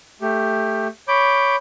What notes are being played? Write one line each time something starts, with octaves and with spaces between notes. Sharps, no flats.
A3 G4
C#5 B5 D6 G6